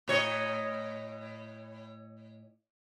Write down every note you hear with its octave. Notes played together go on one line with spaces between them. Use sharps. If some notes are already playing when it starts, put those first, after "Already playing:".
A2 C#5 D#5